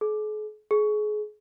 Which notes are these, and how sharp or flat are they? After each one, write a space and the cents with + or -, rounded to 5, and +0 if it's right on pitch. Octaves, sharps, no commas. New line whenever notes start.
G#4 +45
G#4 +30